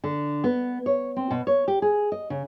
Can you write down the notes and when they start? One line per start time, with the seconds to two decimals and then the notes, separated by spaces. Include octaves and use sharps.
0.04 D3
0.44 B3
0.86 C#5
1.17 C4
1.30 B2
1.47 C#5
1.68 G4
1.82 G#4
2.12 D#5
2.30 C#3